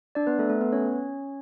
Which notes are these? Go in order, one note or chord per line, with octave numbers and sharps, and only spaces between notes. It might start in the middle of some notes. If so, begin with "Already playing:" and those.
D4 D5
B3 B4
A3 A4
A3 A4
B3 B4
C#4 C#5